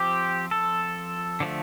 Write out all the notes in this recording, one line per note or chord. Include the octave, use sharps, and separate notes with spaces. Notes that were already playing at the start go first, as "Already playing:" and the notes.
Already playing: F3 C4 G4
A4
D3 F3 A3